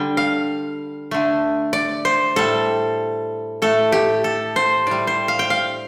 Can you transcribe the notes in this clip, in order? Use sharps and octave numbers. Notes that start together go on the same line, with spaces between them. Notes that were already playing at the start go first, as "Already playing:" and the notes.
Already playing: D3 G3 G5
F5
D3 A3
D5
C5
A2 G3 A4
A2 A3 A4
G4
A4
C5
A2 G3 D5
C5
F5
G5
F5